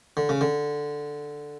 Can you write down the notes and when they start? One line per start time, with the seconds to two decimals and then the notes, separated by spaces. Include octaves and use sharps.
0.17 D3
0.29 C#3
0.41 D3